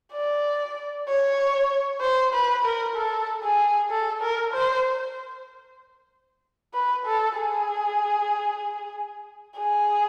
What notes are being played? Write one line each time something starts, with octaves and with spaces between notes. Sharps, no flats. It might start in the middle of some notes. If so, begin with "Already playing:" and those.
D5
C#5
C5
B4
A#4
A4
G#4
A4
A#4
C5
B4
A4
G#4
G#4